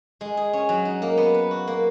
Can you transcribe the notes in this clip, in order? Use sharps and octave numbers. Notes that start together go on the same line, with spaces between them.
G#3
G#4
C#4
F#3
D#4
A#3
B3
B4
F#4
A#3